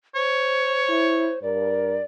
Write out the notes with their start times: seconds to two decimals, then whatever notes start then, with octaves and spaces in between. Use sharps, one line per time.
0.15 C5 C#5
0.88 E4
1.42 G2 A#4 D5